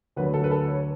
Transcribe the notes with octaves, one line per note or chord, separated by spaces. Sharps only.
D2 D3 F#3 B4
A4
B4
A4
C#5